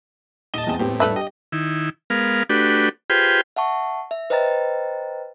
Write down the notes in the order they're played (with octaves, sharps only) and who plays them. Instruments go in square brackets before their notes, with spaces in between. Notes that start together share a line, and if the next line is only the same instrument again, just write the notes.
[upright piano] D#1 D#7 G7 [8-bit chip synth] D#5 A5
[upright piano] E2 C4 G7
[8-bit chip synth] A2 [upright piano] B3 C4 G4
[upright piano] G2 D4 [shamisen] A3 B4 E5
[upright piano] G4 [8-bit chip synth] D#5
[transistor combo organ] D#3 E4
G#3 B3 A#4 F5
A3 D4 F#4 G4 B4
F4 G4 G#4 B4 C5 G5
[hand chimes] E5 F#5 A5 C#6
E5
B4 C5 D#5 G5 A#5 A6